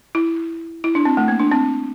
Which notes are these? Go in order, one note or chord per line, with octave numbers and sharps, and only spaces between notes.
E4
E4
D4
C4
A3
A#3
D4
C4